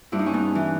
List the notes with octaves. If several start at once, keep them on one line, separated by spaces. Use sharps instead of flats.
G2 E4
D#4
C#4
B3 D#4
E3